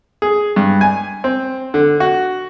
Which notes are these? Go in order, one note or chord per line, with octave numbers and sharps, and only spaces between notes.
G#4
G2
G#5
C4
D3
F#4